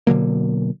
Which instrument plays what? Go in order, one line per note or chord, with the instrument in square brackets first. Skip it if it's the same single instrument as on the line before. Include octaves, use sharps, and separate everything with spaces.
[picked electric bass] B2 D3 F#3 A#3